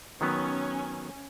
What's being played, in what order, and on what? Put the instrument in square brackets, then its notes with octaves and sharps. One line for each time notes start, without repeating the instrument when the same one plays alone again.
[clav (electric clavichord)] D#3 F#3 B3 [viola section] C#4